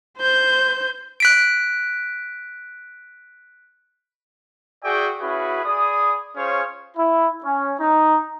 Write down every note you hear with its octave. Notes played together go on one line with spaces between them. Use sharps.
C5 G6
F#6 B6 D7
F#4 G#4 D5 E5 G5
C#4 E4 F#4 G#4 B4
G#4 D5 B5 D#6
C#4 F4 G#4 C5 C#5
E4
C#4
D#4